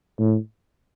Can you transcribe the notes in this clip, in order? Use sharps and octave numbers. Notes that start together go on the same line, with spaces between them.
A2